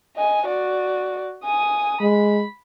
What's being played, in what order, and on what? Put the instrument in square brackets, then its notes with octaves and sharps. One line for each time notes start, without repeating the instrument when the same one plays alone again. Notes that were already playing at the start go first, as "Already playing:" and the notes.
[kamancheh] D#5 G#5
F#4 D5
G#5 D#6
[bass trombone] G#3 [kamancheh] B5